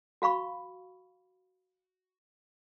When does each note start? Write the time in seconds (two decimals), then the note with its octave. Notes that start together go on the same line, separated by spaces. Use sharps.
0.22 F#4 F5 B5 C#6